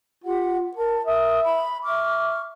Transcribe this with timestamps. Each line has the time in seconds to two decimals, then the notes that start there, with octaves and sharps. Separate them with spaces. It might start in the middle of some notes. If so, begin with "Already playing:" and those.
0.24 F4 G4 F#5
0.77 A#4 A5
1.06 A#4 E5 D#6
1.42 B5
1.85 E5 C#6 D6 F6